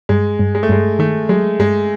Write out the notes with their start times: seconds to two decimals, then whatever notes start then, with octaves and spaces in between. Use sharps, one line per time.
0.09 G2 G#3
0.39 G2
0.55 G#3
0.63 A3
0.69 G2 G#3
0.99 D#3 A3
1.29 F#3 G#3
1.59 G2 G#3